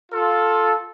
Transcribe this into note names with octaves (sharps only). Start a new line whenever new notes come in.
F4 A4